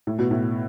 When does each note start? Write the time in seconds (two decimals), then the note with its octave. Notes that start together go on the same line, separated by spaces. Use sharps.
0.07 A2
0.19 B2
0.31 A2